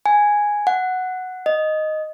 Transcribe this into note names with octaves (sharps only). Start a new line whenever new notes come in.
G#5
F#5
D#5